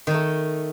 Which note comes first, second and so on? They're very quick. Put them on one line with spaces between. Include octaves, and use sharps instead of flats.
D#3 D#4 A3